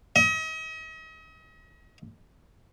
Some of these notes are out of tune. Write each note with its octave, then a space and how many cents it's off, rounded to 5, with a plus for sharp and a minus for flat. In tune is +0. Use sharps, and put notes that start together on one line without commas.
D#5 +40